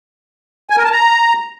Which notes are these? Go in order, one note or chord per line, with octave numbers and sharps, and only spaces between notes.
G#5
A#4
A5
A#5